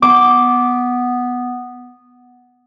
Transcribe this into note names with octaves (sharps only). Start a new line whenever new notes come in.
B3 D6